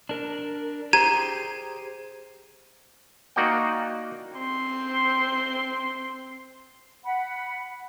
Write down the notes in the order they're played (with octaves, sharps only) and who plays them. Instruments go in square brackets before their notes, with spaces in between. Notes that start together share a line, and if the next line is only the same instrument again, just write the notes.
[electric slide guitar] D4 A#4
[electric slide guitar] G4 G#4 C5 [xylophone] A#5 G#6 D#7
[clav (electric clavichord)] A#3 D#4 F#4 D5 F#5 G5
[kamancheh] C4 C6
[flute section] F#5 B5